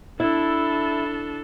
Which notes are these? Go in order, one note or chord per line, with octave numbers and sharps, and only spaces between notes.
D4 E4 A4